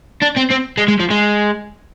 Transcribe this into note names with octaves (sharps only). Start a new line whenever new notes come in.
D4
C4
C4
G#3
G#3
F3
G#3